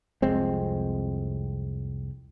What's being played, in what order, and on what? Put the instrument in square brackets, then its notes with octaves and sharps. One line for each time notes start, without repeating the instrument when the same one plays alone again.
[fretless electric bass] C2 F2 G#3 C4